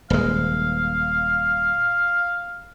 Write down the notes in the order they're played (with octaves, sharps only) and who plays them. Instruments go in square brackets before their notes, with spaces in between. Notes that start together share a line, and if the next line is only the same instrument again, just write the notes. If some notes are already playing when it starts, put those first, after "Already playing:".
[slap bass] D#1 G#3 [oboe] F5